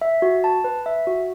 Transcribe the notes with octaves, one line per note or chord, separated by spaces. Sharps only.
E5
F#4
A5
B4
E5
F#4